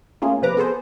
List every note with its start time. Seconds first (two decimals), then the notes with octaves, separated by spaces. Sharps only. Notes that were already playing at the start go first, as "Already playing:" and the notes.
0.22 A3 A#3 C#4 F4 G#4
0.42 C3 F3 B4 A#5 D6
0.57 B3 G#4 A4 C5